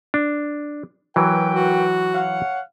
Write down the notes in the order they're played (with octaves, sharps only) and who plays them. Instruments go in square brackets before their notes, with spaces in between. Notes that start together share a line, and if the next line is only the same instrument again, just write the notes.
[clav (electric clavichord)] D4
[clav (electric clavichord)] E3 F#3 [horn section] A#4 B4 G5
[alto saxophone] F#4
[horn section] C#5 F5 F#5